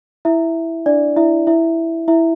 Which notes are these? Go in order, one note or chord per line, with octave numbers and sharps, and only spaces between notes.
E4 E5
D4 D5
E4 E5
E4 E5
E4 E5